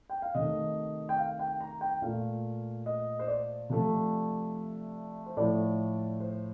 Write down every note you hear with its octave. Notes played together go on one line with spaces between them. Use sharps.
G5
F5
C3 D#3 A3 D#5
G5
F5
G5
A#5
G5
A#2 A3 F5
D#5
C5
D5
C3 F3 A3
C5
A2 F3 A3 D5
C5